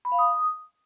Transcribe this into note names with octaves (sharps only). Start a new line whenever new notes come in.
B5
F5
D#6